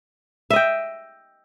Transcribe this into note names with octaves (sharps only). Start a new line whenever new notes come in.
D#5 E5 G5